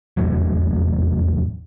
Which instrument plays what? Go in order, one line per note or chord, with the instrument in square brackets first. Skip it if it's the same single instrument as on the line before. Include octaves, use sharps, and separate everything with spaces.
[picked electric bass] F1 E2 A2 F#3